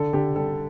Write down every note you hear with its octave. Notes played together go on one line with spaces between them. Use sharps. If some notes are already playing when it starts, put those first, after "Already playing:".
Already playing: D3 A4
D3 G4
G3 A4